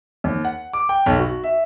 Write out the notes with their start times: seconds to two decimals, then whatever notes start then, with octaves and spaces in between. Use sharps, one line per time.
0.24 D#2
0.45 F#5
0.73 D6
0.89 G5
1.06 B1
1.19 F#4
1.44 E5